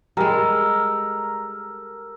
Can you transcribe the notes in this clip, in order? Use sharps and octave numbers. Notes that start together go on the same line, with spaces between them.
G3 G#3 A4 A#4